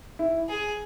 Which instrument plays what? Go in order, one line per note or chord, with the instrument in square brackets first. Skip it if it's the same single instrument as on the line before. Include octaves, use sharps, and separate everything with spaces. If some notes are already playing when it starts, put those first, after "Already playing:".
[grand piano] E4
[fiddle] G#4